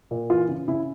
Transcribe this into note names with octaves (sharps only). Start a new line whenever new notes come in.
A#2
E3 F4
C#3
C#3 E4